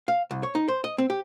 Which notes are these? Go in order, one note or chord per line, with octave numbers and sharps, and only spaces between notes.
F5
C2
C#5
D#4
C5
D#5
C4
G4